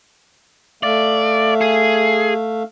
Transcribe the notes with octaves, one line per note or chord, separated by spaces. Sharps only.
A3 D5 E5 F5
G#4